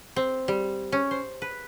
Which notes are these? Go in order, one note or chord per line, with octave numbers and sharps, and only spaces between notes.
C4
G3
C#4
C5
B4